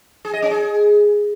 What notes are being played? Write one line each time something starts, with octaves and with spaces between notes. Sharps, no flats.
G#4
D#5
C#4
G#4